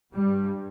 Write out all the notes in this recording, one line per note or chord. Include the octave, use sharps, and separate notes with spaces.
G2 G3